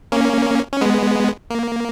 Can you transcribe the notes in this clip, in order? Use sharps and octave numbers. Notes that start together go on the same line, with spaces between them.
A#3 C#4
C#4
G#3 B3
A#3